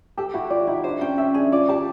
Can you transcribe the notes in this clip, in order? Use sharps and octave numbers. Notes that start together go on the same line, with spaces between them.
G4 A4
E4 F#4
F4 D5
D#4 E4
D4 C5
C#4 G5
C#4 E5
D4 G#4
F4 D5
G4 A5